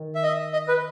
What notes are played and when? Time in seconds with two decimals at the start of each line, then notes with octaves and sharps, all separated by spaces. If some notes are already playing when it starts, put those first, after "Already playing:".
Already playing: D#3
0.15 E5
0.23 D#5
0.53 D#5
0.68 B4